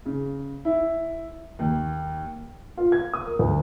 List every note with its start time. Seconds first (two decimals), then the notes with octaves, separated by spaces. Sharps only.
0.06 C#3
0.65 E4
1.59 D#2
2.78 F4
2.92 G#6
3.14 D#6
3.27 A#4
3.39 D2